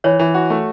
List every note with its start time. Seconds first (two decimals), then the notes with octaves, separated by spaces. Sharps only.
0.04 E3 C#5
0.19 E3
0.34 F#4
0.50 A3